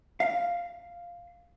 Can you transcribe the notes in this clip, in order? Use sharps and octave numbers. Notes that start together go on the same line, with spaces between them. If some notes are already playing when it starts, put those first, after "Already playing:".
F5